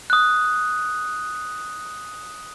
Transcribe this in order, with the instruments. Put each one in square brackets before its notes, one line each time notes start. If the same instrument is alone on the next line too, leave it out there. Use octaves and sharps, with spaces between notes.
[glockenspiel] D#6 F#6